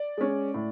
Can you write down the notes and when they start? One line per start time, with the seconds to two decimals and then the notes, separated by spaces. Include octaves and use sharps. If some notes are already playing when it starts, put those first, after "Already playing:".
Already playing: D5
0.17 G#3 C#4
0.54 A2